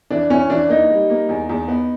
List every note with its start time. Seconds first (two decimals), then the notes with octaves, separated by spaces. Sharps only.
0.10 E3 D4
0.30 E3 C#4
0.50 E3 D4
0.69 A#3 D#4
0.90 G3
1.10 A#3
1.29 E2
1.49 E2
1.68 B3